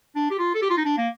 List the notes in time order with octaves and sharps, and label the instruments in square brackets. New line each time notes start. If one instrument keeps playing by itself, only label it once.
[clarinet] D4
G4
F4
A4
G4
F4
D#4
D4
A#3